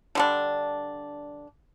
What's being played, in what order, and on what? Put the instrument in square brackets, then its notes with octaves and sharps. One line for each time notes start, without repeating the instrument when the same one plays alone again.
[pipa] D3 G3 D4